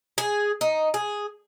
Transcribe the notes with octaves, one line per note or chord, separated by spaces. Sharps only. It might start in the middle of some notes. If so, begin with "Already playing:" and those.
G#4
D#4
G#4